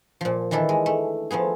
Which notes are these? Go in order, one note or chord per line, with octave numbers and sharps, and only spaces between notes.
A#2 F3
D#3 E3 D4 E4 A4
G#3
A3
F3 A3 B3 G#4